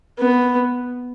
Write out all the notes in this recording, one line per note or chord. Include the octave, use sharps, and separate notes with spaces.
B3